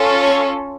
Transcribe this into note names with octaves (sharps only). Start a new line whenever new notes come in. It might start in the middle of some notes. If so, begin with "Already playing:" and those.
Already playing: C#4 F4 A4
C#5